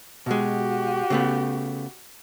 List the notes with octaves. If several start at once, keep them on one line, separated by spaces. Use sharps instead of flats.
B2 G#3 F#4 G4
C#3 A3 B3